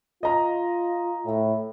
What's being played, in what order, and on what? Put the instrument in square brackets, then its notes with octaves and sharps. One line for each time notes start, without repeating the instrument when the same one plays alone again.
[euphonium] F4 [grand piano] D#5 A#5
[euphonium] A2